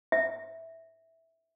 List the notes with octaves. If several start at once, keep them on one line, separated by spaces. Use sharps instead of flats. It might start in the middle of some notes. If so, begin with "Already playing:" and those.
E5